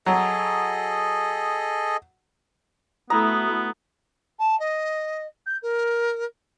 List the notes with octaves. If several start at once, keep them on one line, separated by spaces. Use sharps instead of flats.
F#3 G#4 A4 D#5
A3 B3 E4 F#4 A#5 D#6
A5
D#5
G6
A#4